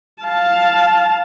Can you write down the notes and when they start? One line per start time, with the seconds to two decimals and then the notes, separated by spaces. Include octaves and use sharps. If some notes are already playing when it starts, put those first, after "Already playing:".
0.24 F5 A5